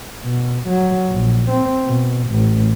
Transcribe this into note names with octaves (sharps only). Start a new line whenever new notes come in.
B2
F#3
A#1
C4
B2
A1